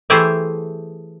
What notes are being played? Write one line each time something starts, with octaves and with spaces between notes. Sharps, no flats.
E3 A3 G4 G#4 C5 E5